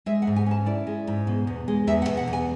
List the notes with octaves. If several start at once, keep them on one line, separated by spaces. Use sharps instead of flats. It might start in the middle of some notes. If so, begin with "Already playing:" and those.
G#3 E5
F#5
G#2
G#5
C#4 A5
E4 D5
G#3
G#2
B2
E2
G#3
E2 E5
F#5
B2
F#5
E2
G#5